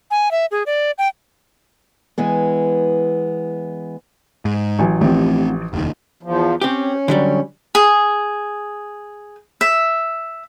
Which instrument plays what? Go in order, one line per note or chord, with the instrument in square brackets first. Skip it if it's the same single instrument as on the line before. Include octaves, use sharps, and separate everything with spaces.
[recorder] G#5
E5
G#4
D5
G5
[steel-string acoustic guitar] E3 G#3 B3
[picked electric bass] G#2
[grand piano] A1 F#3 G#5
[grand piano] A1 F3 G4 [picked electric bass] A3 C4
[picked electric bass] F1 D#2 D#3
[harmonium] E2 F3
[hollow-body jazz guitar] C4 G4 [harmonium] C#4
[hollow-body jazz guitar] D3 F#3 G3
[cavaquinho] G#4
E5